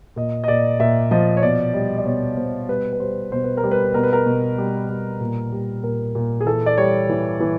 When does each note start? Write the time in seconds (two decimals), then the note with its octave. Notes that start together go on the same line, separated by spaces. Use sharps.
0.16 A#2 D#5
0.44 D#5
0.48 A#2 D5
0.80 A#2 E5
1.11 F3 D#5
1.37 C#5
1.42 B2 D5
1.74 G3 D#5
1.99 D5
2.05 B2 C#5
2.37 B2 C5
2.68 G3 B4
2.93 B4
3.00 G3 C5
3.32 B2 C5
3.44 B4
3.57 A#4
3.63 G3
3.71 B4
3.94 B2 A#4
4.03 B4
4.13 A#4
4.26 B2
4.58 G3
4.89 G3
5.21 A#2
5.52 G3
5.83 A#2 A#4
6.15 A#2
6.41 G#4
6.46 E3 A4
6.66 D5
6.78 G3 C#5
7.09 E3
7.40 E3